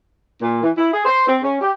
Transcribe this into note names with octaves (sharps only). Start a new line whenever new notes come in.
A#2
E3
E4
G#4
C5
C4
C#4
G4